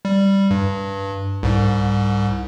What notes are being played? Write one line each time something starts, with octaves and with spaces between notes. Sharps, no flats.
G3
G2
C2 G#2